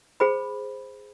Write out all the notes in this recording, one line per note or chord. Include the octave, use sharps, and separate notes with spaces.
G#4 C5 B5